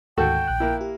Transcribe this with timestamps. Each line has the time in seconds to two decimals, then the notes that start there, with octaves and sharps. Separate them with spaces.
0.18 D2 G#2 D#3 F#4 A4 G5
0.48 A#1 F#6
0.60 A#3 E4
0.81 G4